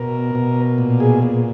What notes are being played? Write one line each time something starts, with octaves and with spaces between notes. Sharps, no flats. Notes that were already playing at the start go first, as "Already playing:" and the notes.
Already playing: B2 A#4
B2
A#2
G#4
A#2